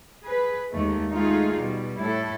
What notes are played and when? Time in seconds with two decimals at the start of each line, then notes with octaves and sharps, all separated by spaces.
0.23 G#4 B4
0.72 D#2 G#3 A3
1.11 G#3 A3 D#4 F4 G#4
1.57 B2 G3
1.98 A2 E4 A4